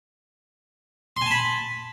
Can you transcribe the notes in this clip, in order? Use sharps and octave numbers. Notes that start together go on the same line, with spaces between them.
G#5 A5 B5 C6